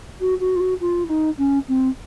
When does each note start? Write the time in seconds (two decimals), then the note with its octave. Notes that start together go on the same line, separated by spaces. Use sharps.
0.20 F#4
0.40 F#4
0.55 F4
0.60 F#4
0.80 F4
1.03 E4
1.09 D#4
1.38 C#4
1.68 C4